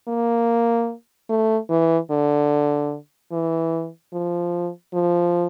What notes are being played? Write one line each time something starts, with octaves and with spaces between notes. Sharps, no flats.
A#3
A3
E3
D3
E3
F3
F3